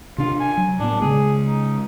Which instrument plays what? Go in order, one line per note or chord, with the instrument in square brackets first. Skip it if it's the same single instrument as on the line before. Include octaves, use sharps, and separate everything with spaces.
[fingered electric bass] C3 D4 [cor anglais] F4
[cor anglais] G#5
[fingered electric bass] F#3
[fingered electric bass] A2 B3 [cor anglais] D4
[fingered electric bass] C#3 G#3 [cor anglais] G#4
[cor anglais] D#4